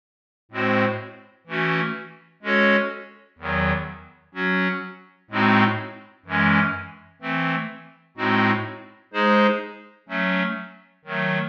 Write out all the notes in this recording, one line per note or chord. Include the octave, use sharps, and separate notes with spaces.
A2 G#3 C4 F#4 C5
E3 A3 C#4 F#4
G#3 C#4 F#4 A4 C#5
E2 D#3 F#3
F#3 C#4 F#4
A2 G#3 C4 D#4 F#4
F#2 E3 G#3 C#4
E3 A3 C4
A2 G#3 C4 D#4 F#4
G#3 D#4 G#4 C5
F#3 A3 C#4
D#3 F#3 A3